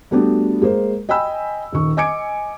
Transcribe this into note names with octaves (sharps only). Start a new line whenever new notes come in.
G3 A3 B3 D4 F#4 G4
G#3 A#3 C5
D#5 G5 G#5 B5 E6
D#1 D#3 C#6
D#5 G#5 D6 G#6 C#7 D7